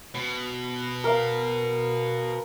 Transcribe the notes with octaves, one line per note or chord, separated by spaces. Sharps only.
B2
A#4 F5